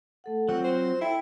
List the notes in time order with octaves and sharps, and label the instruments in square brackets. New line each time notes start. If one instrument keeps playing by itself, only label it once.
[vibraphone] A3 A4 F#5
[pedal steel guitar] F#3 C4 F#4 [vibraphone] F4 [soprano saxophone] F#5
[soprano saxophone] C5
[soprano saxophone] E4 [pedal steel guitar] A4 [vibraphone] G5